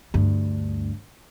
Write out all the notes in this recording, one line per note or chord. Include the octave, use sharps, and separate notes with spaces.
D2 G2